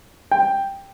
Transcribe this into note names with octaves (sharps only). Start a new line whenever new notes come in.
G5